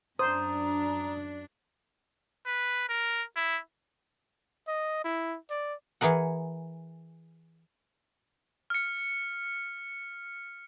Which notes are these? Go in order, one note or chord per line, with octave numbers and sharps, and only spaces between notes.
F#2 D4 C5 A#5 D#6
B4
A#4
E4
D#5
E4
D5
E3 G#4 A#4 F#5
F6 C#7